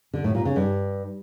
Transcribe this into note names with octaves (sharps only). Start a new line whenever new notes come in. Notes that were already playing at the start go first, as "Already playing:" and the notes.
D3
A2
A#2
C#3
G2